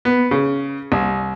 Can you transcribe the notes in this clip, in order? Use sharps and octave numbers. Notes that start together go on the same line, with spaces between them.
B3
C#3
C2